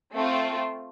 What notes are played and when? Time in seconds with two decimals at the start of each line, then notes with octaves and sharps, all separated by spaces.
0.14 A3 C4 F4